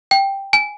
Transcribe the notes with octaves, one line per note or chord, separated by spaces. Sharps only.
G5
G#5